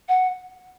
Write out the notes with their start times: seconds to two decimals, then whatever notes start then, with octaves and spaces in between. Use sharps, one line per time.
0.08 F#5